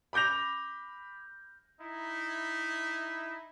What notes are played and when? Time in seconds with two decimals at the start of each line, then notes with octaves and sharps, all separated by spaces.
0.13 B5 D6 G6 A#6 F7
1.81 D#4 E4